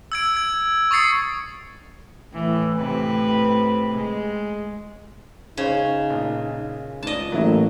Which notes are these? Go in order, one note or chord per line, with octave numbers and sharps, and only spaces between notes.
E6 G#6 D7
G#6
C#6 D#6 A6 C7 C#7
A2 E3
A2 C3 B4
G#3
C#3 D#4 C5 C#5
A#1
C#2 G#2 D5 D#5 A5
A1 F#3 A#3 E4